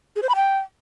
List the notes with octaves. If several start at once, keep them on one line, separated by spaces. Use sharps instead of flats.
G#4
C5
B5
G5